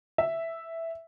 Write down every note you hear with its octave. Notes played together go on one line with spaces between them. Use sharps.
E5